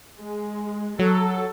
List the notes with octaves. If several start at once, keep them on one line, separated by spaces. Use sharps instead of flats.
G#3
F#3 A4